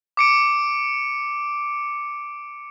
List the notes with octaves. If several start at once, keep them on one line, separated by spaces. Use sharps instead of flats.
D6 C#7 D7